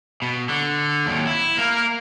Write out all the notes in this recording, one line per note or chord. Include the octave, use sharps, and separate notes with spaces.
B2
D3
D#2 F#3
E4
A#3 A#4